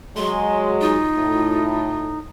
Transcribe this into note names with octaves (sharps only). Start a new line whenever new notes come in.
F#3 G#3 C6
D#4 F4
A2